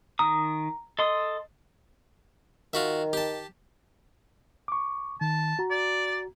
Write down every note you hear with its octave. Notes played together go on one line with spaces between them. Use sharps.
D#3 A#5 D#6
A4 D#5 C6 D#6
D#3 F4 F#4 E5
G4 A5
C#6 D6
D#3 A5
F#4 A#5
D5